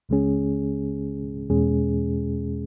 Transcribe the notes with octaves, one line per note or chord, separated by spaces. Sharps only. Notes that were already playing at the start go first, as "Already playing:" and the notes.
C#2 C#3 G#3 C#4 G#4
E2 B2 G#3 C#4 G#4